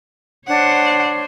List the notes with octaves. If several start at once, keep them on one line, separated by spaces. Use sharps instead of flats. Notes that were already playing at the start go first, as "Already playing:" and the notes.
D4 C5 C#5 F#5